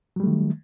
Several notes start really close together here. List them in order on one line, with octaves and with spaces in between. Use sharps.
F#3 G3 A3 D#3